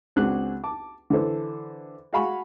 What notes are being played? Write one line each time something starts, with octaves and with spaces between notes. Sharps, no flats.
C#2 C4 D4 F#4 G#4 F#6
A5 D6
D3 E3 A4 C5
F#4 G#4 F5 G#5 B5 C#6